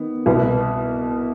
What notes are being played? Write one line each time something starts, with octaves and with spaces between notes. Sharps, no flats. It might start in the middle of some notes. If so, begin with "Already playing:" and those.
Already playing: D#3 B3
C2 B2 B3